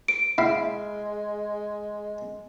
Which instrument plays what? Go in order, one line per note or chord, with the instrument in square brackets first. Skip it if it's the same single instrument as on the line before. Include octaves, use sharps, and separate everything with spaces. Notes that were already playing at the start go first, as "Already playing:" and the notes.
[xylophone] D7
[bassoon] G#3 [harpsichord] E4 F5